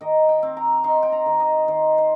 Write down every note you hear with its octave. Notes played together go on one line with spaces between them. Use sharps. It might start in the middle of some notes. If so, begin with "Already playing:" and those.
D#3 D#5
G5
C4
A#5
D#4 C6
G5
A#5
D#3
D#5
D#3 C5
C5